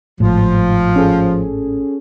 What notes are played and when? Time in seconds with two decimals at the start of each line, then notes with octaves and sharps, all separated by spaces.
0.20 G#1 A2 F3
0.96 C#4 G#4 A4